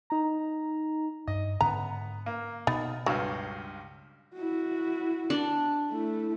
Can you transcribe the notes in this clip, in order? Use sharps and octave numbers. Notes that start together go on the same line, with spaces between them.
D#4 A#5
G2 D#5
G#2 D3 B3 C#4 A#5
A#3
B2 B3 D#4
C#2 G2 F#3 F5
E4 F#4
D4
A3 E4